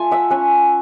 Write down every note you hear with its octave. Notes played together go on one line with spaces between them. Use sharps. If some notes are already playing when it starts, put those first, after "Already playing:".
Already playing: A3 F4 G#5
E5 F#5
C#4 F#5 G#5